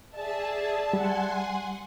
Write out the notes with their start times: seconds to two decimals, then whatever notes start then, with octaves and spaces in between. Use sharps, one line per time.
0.15 G#4 D5 E5 A5
0.93 G3 F#5 G#5 C6